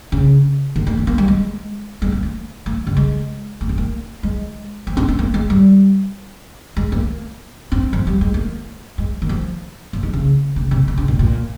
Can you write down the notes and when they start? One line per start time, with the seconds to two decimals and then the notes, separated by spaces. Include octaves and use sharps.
0.12 C#3
0.76 D#3
0.87 A#3
0.97 C4
1.07 A#3
1.18 G3
1.28 G#3
2.02 G#3
2.12 A#3
2.23 A#3
2.66 A#3
2.87 C#3
2.97 G#3
3.61 A#3
3.69 C4
3.78 A#3
4.23 G#3
4.87 F3
4.97 C4
5.08 C4
5.19 A#3
5.34 G#3
5.50 G3
6.77 G#3
6.92 A#3
7.72 C4
7.93 F3
8.07 G3
8.21 G#3
8.34 A#3
8.98 G#3
9.22 D#3
9.29 F3
9.93 F3
10.03 D#3
10.13 C#3
10.56 C#3
10.71 C3
10.88 C3
10.98 C#3
11.08 A#2
11.19 A#2